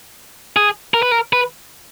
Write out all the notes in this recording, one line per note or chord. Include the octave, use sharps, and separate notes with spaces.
G#4
A#4
B4
A#4
B4